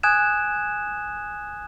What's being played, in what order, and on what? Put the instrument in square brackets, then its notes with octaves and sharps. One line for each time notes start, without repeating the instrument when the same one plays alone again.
[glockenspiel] G#5 D#6 F#6 G#6 E7